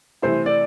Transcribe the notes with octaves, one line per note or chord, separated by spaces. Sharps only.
C3 E3 A3 E4 A4 C5
D5